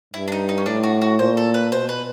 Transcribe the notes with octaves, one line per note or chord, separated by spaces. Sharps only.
G2 E4
D4
D#4
D#4
C#4
A2 D4
F#4
F#4
A#2 C5
A4
B4
B2 C5
B4